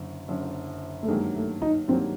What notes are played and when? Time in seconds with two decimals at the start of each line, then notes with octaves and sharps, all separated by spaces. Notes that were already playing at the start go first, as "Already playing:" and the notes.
Already playing: F#1 F#2 D3
0.28 F#1 F#2 D3
1.02 A3
1.08 G2 D#3 F#3 G#3 A#3
1.35 A3
1.62 D#4
1.88 G2 D#3 F#3 A#3 C4